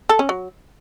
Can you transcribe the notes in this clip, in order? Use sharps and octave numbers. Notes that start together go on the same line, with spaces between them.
A4
C#4
F#3